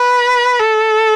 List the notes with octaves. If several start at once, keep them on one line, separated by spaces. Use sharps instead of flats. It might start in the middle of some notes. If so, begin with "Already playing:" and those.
Already playing: B4
A4